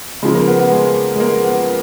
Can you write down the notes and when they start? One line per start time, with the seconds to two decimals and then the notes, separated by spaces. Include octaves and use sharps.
0.23 C#3 F3 G#3
0.35 A#3
0.47 B3
0.59 B3
0.72 G#3
1.15 G#3
1.20 A#3
1.44 B3